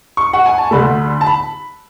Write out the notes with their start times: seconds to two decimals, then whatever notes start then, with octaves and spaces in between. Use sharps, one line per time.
0.17 C#6
0.33 F#5
0.46 G#5
0.58 A5
0.71 D2 D3 A3 B5
1.21 A5
1.26 B5